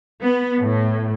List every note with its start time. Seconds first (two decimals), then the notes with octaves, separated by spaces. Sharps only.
0.21 B3
0.61 A2